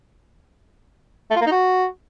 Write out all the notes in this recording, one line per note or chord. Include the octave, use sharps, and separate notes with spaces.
A3
F4
A#3
D#4
F#4